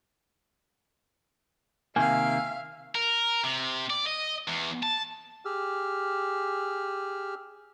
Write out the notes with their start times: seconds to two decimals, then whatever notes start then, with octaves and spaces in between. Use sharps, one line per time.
1.96 C3 D#3 A#3 E5 F5 G#5
2.95 A#4
3.44 C3
3.90 D5
4.06 D#5
4.48 E2
4.83 A5
5.45 G4 G#4 E6 F6